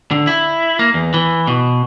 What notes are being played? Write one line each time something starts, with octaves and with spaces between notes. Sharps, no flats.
D3
E4
A#3
E2
E3
B2